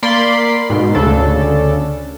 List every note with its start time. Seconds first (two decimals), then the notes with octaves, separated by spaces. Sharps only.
0.03 A#3 D5 B5 C6
0.70 G#2 B2
0.95 D2 C#3 D4 A4